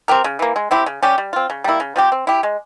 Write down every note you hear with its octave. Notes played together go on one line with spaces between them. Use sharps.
C4 G4 A#4
C#3
E3 A#3
G#3
C4 E4 G4
C#3
G3 C#4 G4
G3
C4 F4
C#3
G3 A#3 E4
C#3
F3 C4 G4
C4
E4 G4
G#3